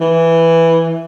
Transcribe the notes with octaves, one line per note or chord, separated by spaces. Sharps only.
E3